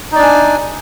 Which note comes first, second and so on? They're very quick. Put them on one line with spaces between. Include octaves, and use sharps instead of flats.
D#4 D5 D4 G#5